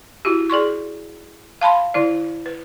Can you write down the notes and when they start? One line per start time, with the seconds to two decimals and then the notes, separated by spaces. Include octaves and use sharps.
0.25 E4 F#4 G4
0.50 G#4 D5 C6 C#6
1.61 F5 A5 B5 C6
1.94 D3 E4 D5
2.46 B4